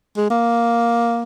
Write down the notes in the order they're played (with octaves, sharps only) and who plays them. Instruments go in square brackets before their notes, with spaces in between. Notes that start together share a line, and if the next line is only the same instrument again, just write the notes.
[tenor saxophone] G#3
A#3